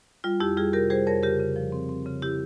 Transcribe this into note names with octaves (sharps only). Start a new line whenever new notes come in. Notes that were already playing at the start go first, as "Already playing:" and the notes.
G3 F4
F2 E4 G4
G3 F4 G#4
C3 G4 A#4
G3 G#4 C5
F2 A#4 C#5
C#3 G4 A#4
C#3
F3
C4
C4
C#3
E4 G4